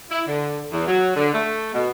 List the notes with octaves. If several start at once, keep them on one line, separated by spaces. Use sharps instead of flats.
E4
D3
E2
F#3
D3
A3
B2